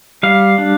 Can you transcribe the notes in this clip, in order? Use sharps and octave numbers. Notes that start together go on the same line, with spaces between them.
G3 F5
D4